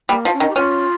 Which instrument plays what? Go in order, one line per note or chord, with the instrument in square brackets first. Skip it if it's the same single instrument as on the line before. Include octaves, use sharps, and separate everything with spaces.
[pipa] G3 [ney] A#3
[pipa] F3
[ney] C#4
[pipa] D#3
[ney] G4
[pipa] C#4 [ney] F4